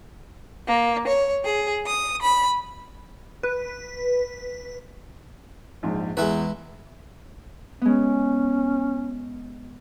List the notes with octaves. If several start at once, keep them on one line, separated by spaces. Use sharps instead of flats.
A#3
C#5
G#4
D#6
B5
B4
A#1 G#2
E2 G#3 E4 B4
G#3 B3 C#4